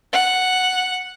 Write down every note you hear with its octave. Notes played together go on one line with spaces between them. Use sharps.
F#5